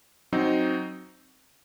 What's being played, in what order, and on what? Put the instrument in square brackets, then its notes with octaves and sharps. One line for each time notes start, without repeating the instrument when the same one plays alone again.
[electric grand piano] F#3 C4 D#4